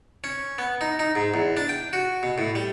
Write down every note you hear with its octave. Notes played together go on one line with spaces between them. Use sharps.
C#4
B3
D#4
D#4
G#2
E2
D4
G5
F#4
B2
A2
G3